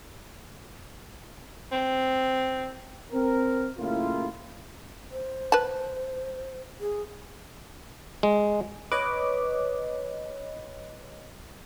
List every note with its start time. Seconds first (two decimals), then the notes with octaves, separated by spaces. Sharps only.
1.72 C4
3.12 C4 A#4
3.78 F#2 A2 C#3 A#3 E4 F4
5.11 C5
5.52 B4 A5
6.80 G#4
8.23 G#3
8.92 B4 C#5 D#5 D6